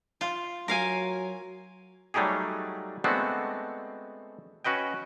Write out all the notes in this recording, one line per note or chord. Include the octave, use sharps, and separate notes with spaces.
F4
F#3 A#4 F5 G#5
F#3 G3 A3 D#4 G4 G#4
G#3 A3 B3 C4 D4 F#4
C#4 F#4 B4 D#5 G5